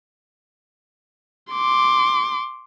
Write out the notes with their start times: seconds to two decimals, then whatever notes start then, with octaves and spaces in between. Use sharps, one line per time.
1.53 C6 D6